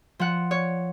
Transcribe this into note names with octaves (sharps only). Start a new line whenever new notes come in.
F3 F#5
C#5